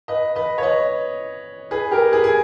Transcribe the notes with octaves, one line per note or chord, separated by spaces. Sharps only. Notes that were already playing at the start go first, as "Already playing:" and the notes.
B4 D#5
B4 D#5
C#5
B4 D#5
G#4 B4
G4 A#4
G#4 B4
G#4